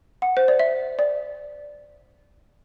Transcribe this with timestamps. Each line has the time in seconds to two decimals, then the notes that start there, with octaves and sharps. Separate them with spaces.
0.22 F#5
0.37 C5
0.48 D5
0.60 E5
0.99 D5